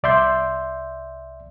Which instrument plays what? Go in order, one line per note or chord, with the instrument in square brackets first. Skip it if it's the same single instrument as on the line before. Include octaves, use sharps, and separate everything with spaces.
[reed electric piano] C2 D5 E5 C6 G6